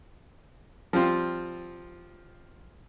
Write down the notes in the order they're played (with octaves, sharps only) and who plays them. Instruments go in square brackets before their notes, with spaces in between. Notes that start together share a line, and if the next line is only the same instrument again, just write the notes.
[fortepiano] F3 G3 C4 F4